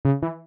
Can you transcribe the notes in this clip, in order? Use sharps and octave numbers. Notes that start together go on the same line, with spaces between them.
C#3
E3